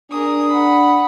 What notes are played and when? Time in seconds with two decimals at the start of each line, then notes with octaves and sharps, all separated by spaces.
0.11 D4 G#4 A#4 D#6
0.48 F#5 B5